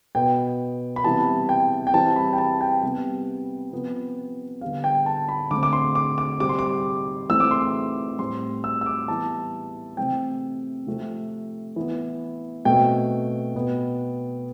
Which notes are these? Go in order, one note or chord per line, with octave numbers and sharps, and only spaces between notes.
B2 B3 G5
B5
C3 E3 G3 B3 A5
G5
G5
E3 G3 C4 A5
B5
G5
A5
G5
C3 G3 B3
C3 F3 B3
D3 G3 B3 F5
G5
A5
B5
D3 A3 C4 D6
D6
C6
D6
D6
C3 G3 C4 D6
C6
D6
E3 A3 C4 E6
D6
C6
D6
A2 G3 C4 C6
E6
E6
D6
E3 G3 B3 A5
C3 E3 A3 C4 G5
C3 F3 A3 C4
E3 B3
B2 A3 C4 G5
B2 B3